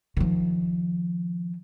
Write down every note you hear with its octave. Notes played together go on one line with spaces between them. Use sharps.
D#3 F3